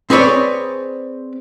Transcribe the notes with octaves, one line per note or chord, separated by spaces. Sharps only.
C4 G#4 B4 C#5 D5